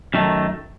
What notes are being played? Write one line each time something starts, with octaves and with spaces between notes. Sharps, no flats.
F#2 D#3 A3